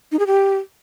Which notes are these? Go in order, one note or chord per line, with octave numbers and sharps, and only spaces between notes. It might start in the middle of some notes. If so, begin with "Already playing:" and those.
D#4
G#4
G4